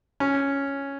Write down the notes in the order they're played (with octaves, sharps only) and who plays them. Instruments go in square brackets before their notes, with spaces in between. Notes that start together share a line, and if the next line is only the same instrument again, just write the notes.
[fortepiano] C#4